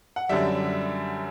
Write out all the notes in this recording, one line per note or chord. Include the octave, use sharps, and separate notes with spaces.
F#5
F#2 D3 G3 E5